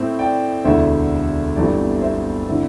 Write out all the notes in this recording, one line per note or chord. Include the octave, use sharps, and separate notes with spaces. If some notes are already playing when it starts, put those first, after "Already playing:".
Already playing: A2 A3 C4 E4
D5 G5
E1 D2 D3 A3 E4 C5 E5
G1 G2 E3 A3 C4 D5
C5 E5
D3 C4 E4